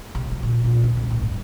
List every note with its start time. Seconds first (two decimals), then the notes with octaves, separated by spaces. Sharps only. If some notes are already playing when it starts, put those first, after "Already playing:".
0.15 C3
0.31 F#3
0.43 A#2
0.64 A#2
0.83 C#3
0.97 C2
1.11 A2
1.22 G2